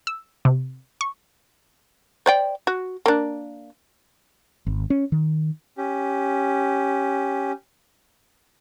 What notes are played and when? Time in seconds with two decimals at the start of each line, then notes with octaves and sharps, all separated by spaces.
0.07 E6
0.45 C3
1.01 C#6
2.26 C5 D5 G5
2.67 F#4
3.06 A#3 D4
4.66 G#1
4.90 C#4
5.12 D#3
5.78 C#4 G4